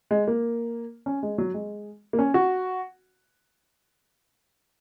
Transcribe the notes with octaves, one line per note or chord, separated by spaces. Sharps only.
G#3
A#3
C#4
G#3
F#3
G#3
A#3
C#4
F#4